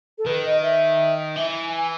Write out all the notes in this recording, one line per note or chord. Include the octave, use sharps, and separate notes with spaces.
A4
D#3 B4
D#5
E5
E3 E5
G#5
G#5